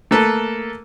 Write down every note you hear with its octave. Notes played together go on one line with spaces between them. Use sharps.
A3 A#3 A4 B4